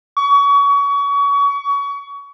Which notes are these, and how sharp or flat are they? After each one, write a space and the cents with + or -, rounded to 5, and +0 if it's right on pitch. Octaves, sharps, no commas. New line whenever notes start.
C#6 +30